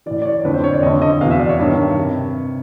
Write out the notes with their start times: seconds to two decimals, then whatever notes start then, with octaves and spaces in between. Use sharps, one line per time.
0.06 A2 E3 D5
0.22 D5
0.25 C#5
0.44 F2 D3 B4
0.54 C5
0.64 C#5
0.73 D5
0.83 F2 D3 D#5
1.02 D#5
1.21 E2 B2 F5
1.31 E5
1.39 D5
1.49 C#5
1.59 G2 D#3
1.98 C3